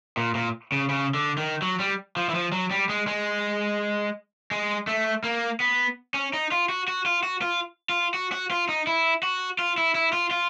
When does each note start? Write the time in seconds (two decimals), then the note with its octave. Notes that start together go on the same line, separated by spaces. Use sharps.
0.17 A#2
0.35 A#2
0.72 C#3
0.89 C#3
1.14 D3
1.38 D#3
1.62 F#3
1.79 G3
2.17 F3
2.29 E3
2.35 F3
2.52 F#3
2.71 G3
2.89 G#3
3.07 G#3
4.51 G#3
4.87 A3
5.24 A#3
5.60 B3
6.14 C#4
6.33 D#4
6.52 F4
6.69 F#4
6.88 F#4
7.06 F4
7.23 F#4
7.42 F4
7.89 F4
8.14 F#4
8.32 F#4
8.51 F4
8.69 D#4
8.87 E4
9.23 F#4
9.59 F4
9.78 E4
9.95 E4
10.13 F4
10.31 F4